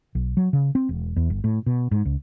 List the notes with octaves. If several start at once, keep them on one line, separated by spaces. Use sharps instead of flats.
B1
F#3
C#3
C4
E1
E2
G1
A2
B2
G#2
C#2